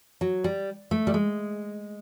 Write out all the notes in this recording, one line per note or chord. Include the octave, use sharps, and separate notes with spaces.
F#3
G3
A3
G3
G#3